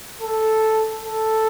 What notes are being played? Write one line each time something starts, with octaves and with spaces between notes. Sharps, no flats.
A4
A4